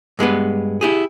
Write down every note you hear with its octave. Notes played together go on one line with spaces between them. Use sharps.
G2 G#3 B3 B4
E4 G4 G#4